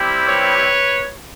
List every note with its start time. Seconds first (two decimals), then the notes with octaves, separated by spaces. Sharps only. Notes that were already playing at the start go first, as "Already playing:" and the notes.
Already playing: G3 C4 E4 G4
0.26 B4 C#5